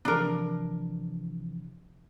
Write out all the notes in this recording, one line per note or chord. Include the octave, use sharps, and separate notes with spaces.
C3 E3 F3 D4 A#4